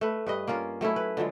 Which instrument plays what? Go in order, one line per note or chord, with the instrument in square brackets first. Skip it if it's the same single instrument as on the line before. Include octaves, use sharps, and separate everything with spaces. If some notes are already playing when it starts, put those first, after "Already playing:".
[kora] A3 B4
G2 B4 D#5
A#3 C#4 F4 A#4
F#3 A3 C#4 E4
B4
D3 F3 F#3 G#3